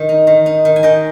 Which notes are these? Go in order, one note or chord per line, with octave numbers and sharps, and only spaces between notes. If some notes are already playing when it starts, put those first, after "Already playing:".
Already playing: D#3
D#4
D#3
D#4
D#3
G#5
D#3 D#5 G5